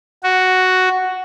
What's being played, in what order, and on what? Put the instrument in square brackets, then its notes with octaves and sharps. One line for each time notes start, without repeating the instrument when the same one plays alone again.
[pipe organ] F#4